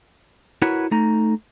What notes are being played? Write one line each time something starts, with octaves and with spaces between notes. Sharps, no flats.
E4 F#4 A#4 B4 C#5 F#5
A3 D#4 A#5